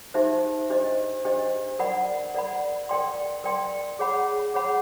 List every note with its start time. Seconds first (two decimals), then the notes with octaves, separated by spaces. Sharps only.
0.14 D#4 G4 C5 E5
0.70 D4 G4 C5 D#5
1.25 D4 G4 C5 D#5
1.79 A#4 D5 F#5 B5
2.34 A#4 D5 F#5 B5
2.89 A#4 D5 G5 C6
3.44 A#4 D5 G5 C6
3.99 G#4 C#5 F#5 B5
4.54 G#4 C#5 F#5 B5